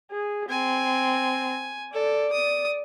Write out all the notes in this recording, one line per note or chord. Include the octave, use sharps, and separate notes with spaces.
G#4
C4 G#5
A4 D5
D#6